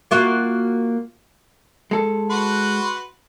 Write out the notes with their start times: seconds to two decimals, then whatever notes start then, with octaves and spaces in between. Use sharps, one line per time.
0.11 A#3 F4 F#4
1.91 G#3 A4
2.30 F#4 B4 C6